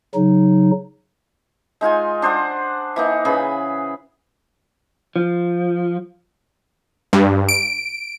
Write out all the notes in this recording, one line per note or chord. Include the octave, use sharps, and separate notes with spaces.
C#3 F#3 D#4
G#3 D#4 F4 G#5
D4 C5 D#5 F#5
E3 A#3 D#4
C#3 E3 G#4 B5
F3
G2
D7